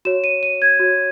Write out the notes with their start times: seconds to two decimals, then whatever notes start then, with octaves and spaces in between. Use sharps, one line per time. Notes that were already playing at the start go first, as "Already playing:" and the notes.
0.05 F#4 C#5 E7
0.24 D#7
0.43 D#7
0.62 G#6
0.80 F#4 C#5